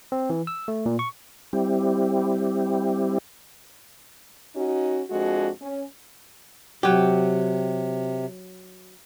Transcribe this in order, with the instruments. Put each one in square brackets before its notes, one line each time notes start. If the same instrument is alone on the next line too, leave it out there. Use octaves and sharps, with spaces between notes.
[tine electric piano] C4
E3
E6
A3
A#2
C#6
[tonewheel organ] G3 C4 E4 G4
[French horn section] C#4 D#4 F#4
F2 G#3 D4 F#4
C#4
[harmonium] C3 [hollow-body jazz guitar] F#3 G4